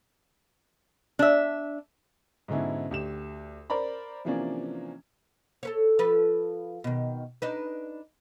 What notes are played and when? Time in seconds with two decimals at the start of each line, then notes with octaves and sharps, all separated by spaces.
1.19 D4 E5
2.48 G#2 B2 D3 C#4 E4
2.91 D2 G4 E7
3.70 A#4 C5 D5 A#5 B5
4.25 C3 E3 F3 A#3 C#4 D4
5.63 A4 B4 C#5
5.99 F3 A4 B4
6.84 B2 D#3
7.42 D4 D#4 B4